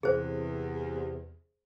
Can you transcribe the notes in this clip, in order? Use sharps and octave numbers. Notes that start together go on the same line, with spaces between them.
E2 C3 G#4 C5